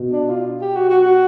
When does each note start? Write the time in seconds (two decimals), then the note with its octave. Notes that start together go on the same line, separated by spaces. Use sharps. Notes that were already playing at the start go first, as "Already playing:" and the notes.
Already playing: B2
0.11 D4
0.29 F4
0.61 G4
0.76 F#4
0.90 F#4
1.03 F#4